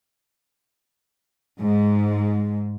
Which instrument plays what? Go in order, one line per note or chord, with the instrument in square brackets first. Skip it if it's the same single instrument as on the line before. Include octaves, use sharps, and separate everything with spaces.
[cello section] G#2